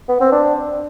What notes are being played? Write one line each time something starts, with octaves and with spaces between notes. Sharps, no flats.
B3
C4
D4